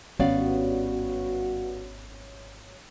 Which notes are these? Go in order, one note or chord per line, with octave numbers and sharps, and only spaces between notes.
G#1 G2 B3 C#4 F#4 C#5 D5 F5